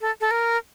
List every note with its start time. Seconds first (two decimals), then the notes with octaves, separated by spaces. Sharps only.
0.01 A4
0.21 A4
0.31 A#4